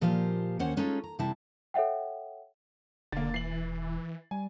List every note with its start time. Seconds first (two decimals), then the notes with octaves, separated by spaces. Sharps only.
0.01 A#2 F3 G4 C5 F5
0.59 D#2 D#3 C#4 C5 C#5 F#5
0.77 G#3 C#4 D#4 F4 G#4 A4
1.04 A#5
1.19 C3 G3 C4 E4 A5
1.74 A4 C#5 E5 F#5 G5
3.12 E1 D3 A#3 A6
3.34 E3 C7 F#7
4.31 G3 G#5